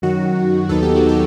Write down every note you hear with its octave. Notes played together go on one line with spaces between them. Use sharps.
F#2 D#3 F#3 F#4
D#2 D#3 F#3 B3 D#4 A4
G4
F#4
G4